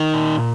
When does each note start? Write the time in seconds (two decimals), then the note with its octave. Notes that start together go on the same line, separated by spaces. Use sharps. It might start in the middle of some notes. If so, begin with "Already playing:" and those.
Already playing: D#3 D#4
0.14 A#2